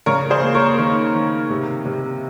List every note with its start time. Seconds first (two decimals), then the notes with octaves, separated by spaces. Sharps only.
0.06 C#3 A#4 C#5
0.30 G#4 C5
0.42 A#3
0.54 A#4 C#5
0.78 D#3
1.14 D#3
1.50 C3
1.85 C3